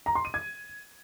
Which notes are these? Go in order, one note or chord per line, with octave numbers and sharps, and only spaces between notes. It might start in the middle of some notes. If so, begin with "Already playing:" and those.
A#5
C6
D#7
G#6